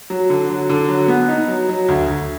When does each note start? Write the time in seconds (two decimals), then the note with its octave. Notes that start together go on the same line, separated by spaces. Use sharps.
0.10 F#3
0.30 D3
0.49 F#3
0.69 D3
0.89 F#3
1.08 B3
1.28 D#4
1.48 F#3
1.69 F#3
1.88 D2
2.08 D2